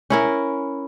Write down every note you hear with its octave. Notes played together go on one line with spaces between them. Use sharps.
C#4 E4 A#4